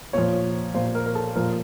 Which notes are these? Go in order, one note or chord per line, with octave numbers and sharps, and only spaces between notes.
A#2 F3 C#5
A#2 F3 C5
A#4
A#4
A4
A#2 F3 A#4